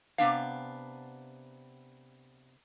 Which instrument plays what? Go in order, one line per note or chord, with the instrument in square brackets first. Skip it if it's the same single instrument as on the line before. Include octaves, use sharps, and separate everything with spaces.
[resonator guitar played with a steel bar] C3 B3 D4 F5